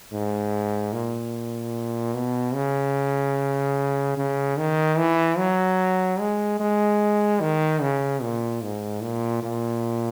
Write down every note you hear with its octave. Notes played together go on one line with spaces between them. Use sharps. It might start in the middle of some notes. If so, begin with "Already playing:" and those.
G#2
A#2
B2
C#3
C#3
D#3
E3
F#3
G#3
G#3
D#3
C#3
A#2
G#2
A#2
A#2